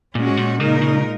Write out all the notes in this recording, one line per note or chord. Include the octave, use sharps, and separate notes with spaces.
A#2 G#3 C#4 F#4
G#2
A#2
A#2 C#3 G#3 D#4 A#4
C#3